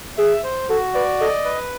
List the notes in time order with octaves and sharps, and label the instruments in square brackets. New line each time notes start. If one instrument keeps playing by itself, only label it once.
[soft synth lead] G#4 [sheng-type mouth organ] E5
[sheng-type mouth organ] C5
[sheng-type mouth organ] F#4 [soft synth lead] A4
[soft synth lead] B4 [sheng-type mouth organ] D5
[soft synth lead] A4 [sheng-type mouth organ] D#5
[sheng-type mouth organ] B4